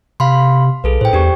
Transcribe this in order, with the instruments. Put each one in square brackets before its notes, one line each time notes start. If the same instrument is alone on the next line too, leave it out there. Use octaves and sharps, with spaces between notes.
[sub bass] C3 [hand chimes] F5 B5 C6
[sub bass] B1 [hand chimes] G#4 A4 B4
[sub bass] A2 [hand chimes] C5 G5
[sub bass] E2 [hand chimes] D4 G4 C#6